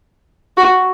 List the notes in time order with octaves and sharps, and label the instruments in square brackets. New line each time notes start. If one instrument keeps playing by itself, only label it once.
[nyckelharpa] F#4